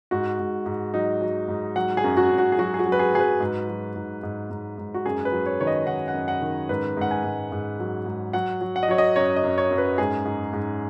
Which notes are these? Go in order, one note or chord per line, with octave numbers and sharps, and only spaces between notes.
G#2 F#4
G#2
G#2
F#3 D#4
F#3
G#2
F#3 F#5
G#4
F#2
F#4
F#2
F#4
G#4
F#3 F#4
G#4
F#4
F#3
B4
G#4
F#3 G#4
B4
G#2
F#3
G#2
G#2
G#2
G#2
F#4
F#2 G#4
B4
F#3
C#5
D#3 C#5
D#5
D#3 F#5
F#5
F#2
F#5
D#3
G#2 B4
G#2 F#5
G#5
G#2
G#2
F#3
G#2
F#3 F#5
F#3
F#5
D#5
F#3 C#5
D#5
F#2 C#5
D#5
F#2
C#5
F#2
B4
G#2 G#4
G#2
G#2